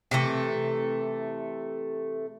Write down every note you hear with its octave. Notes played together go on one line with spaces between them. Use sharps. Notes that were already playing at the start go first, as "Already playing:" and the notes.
C3 E3 A3